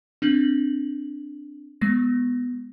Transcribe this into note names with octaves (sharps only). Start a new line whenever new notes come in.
C4 D4 F#7
G#3 B3 A#6